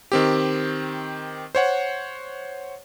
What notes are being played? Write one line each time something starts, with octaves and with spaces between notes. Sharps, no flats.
D#3 C4 G4
C5 C#5 F#5